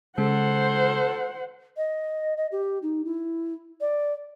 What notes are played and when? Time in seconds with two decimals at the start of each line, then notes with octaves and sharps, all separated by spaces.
0.18 C#3 G#3 A4 C5 F#5
1.77 D#5
2.37 D#5
2.52 G4
2.82 D#4
3.05 E4
3.81 D5